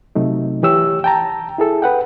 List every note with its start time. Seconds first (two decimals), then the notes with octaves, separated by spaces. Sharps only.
0.15 C3 F#3 A3 D#4
0.63 E3 G4 C#5 E6
1.04 G5 A5 A#5
1.58 E4 G#4 A4
1.82 B4 F#5 G5